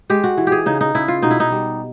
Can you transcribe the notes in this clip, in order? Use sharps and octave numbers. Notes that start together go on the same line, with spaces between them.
G#3 G4
F#4
E3
G4 G#4
C#3 D#4
D#4
C#3 E4
F4
B2 D#4
E4
D#4
G3